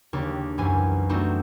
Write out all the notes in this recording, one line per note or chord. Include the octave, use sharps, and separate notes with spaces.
D#2 C#3 D4
C2 F#2 E3 G#5
A3 B3 C4 D4 D#4 F#4